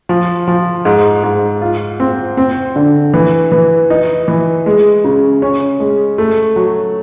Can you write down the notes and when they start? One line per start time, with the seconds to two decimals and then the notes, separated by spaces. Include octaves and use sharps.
0.09 F3
0.48 F3
0.85 G#2
1.24 G#2
1.61 F4
2.00 C4
2.37 C4
2.76 D3
3.14 E3
3.52 E3
3.90 D#4
4.28 E3
4.66 G#3
5.04 C#3
5.42 C#4
5.80 G#3
6.18 A3
6.56 F#3